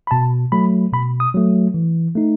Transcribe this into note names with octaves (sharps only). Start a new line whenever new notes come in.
B5
B2 A5
F#3 A3 B5
B2 B5
D#6
F#3 A3
E3
A3 D#4